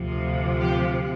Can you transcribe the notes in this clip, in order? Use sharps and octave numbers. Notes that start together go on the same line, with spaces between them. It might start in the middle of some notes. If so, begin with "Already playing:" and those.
Already playing: D2 C3 F3
G4